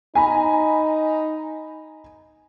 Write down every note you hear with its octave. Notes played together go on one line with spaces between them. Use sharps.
D#4 G#5 A#5 B5